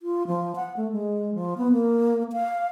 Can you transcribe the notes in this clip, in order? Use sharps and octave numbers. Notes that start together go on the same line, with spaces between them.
F4
F3
F#5
A3
G#3
F3
B3
A#3
F5